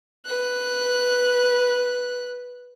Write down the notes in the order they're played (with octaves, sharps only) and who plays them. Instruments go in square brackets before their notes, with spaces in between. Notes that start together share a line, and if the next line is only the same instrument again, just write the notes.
[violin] B4 F#6